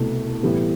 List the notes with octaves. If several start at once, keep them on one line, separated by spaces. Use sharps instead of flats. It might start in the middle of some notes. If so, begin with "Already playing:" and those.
Already playing: C2 B2 A3
A2 E3 G3 B3